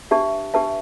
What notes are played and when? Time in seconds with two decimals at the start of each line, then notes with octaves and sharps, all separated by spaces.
0.11 D4 G4 B4 E5 A5
0.54 D4 G4 B4 E5 A5